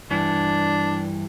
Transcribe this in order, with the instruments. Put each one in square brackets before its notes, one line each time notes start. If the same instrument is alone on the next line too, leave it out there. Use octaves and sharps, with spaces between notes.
[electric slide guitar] G2 E3 [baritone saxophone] D4